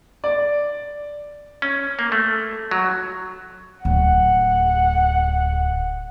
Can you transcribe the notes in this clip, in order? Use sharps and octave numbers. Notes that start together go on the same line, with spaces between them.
D5
C#4
A#3
A3
F#3
D1 F#5